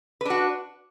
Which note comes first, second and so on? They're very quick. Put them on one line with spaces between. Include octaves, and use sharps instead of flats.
B4 D4 F#4